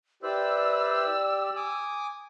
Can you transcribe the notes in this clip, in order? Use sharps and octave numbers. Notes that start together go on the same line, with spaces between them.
E4 G4 B4 C5 D5 E6
G#5 D6 D#6